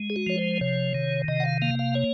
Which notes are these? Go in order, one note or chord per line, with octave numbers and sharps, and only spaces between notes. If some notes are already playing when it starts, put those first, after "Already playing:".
Already playing: G#3
G#4
F#4
F3 C#5
C5
C3 C#5
D#3
C3 D#5
F#5
F5
A#3 F5
F5
C#5